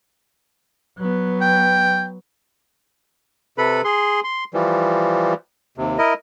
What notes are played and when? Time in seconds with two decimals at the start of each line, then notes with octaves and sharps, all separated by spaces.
0.98 F#3 B3
1.41 G5
3.58 C3 A4 B4 B5
3.84 G#4 C6
4.24 C6
4.54 E3 F3 G3
5.78 D#2 C3
5.98 E4 A#4 D#5